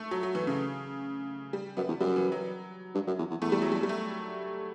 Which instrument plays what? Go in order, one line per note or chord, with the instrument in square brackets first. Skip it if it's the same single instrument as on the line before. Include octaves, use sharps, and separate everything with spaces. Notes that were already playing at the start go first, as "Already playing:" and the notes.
Already playing: [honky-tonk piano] A3
F#3
F#3
E3
C#3
G3
[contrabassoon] F#2 [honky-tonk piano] B3
[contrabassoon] E2
[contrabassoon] F#2 [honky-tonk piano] G3
[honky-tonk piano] E3
F#3
[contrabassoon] G2
F#2
E2
E2
[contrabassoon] E2 [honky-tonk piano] A3
[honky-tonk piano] G3
F#3
G3
G3
A3